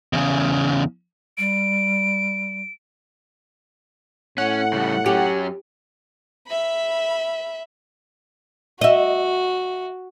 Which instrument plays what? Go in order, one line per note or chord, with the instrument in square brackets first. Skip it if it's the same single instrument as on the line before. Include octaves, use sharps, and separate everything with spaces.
[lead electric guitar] E2 C#3
[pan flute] G3 [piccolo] D7
[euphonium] A2 [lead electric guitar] C#4 [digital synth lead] F#5
[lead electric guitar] C#3 G3
[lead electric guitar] F#2 C#4 [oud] G4
[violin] E5 B5
[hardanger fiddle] F#4 [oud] D#5 E5